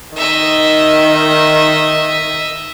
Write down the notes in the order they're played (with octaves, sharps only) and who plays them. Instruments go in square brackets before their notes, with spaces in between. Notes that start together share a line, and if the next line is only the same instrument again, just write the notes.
[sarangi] D#3 [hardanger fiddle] D#5 E5